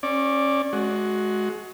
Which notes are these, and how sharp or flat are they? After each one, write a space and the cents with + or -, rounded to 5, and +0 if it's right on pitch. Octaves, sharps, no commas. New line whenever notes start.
C#4 -25 D5 +0
G#3 +25 F#4 +0